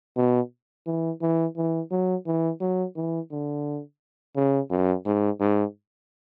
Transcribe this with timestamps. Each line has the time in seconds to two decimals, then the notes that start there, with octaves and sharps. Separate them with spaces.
0.17 B2
0.87 E3
1.22 E3
1.57 E3
1.91 F#3
2.26 E3
2.61 F#3
2.96 E3
3.31 D3
4.36 C#3
4.71 F#2
5.06 G#2
5.40 G#2